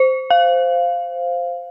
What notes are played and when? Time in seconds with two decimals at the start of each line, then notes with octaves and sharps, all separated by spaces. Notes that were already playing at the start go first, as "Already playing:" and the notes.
Already playing: C5
0.30 F5